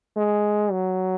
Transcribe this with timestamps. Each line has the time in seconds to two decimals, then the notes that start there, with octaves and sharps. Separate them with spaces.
0.16 G#3
0.71 F#3